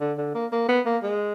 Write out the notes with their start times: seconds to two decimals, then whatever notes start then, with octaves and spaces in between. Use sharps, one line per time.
0.01 D3
0.18 D3
0.34 A#3
0.52 A#3
0.68 B3
0.85 A#3
1.03 G#3